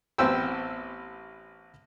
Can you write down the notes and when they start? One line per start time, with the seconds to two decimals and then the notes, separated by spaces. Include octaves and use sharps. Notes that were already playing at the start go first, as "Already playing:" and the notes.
0.18 A1 B3 C4 C5 G5 E6